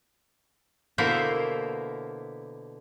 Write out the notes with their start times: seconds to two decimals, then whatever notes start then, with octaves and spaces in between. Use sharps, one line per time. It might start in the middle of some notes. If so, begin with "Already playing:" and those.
0.98 B2 D3 A#3 E4 C5 E5